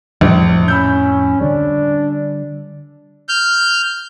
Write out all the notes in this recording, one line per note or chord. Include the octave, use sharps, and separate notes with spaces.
A#1 F2 A2
C#4 B5 E6 G6
D3 G3 D4
F6 G6